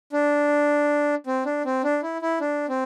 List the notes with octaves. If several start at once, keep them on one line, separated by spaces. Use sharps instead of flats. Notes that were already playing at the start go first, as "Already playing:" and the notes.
D4
C4
D4
C4
D4
E4
E4
D4
C4